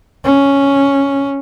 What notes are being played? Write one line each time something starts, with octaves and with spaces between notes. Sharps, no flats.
C#4